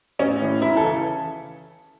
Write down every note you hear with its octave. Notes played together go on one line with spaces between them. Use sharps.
A1 C#4
A2 E3
E1 E4
A4
C#3 E3